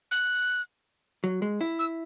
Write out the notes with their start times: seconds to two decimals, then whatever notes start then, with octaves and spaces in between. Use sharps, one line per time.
0.11 F#6
1.24 F#3
1.42 G#3
1.61 E4
1.79 E6